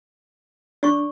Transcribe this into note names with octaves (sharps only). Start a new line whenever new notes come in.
D4 D5 C#6